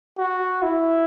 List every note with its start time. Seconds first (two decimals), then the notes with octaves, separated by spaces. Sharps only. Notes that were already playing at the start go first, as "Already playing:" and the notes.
0.18 F#4
0.62 E4